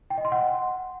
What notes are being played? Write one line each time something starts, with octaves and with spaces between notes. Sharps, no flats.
G5
D#5
C6
F#5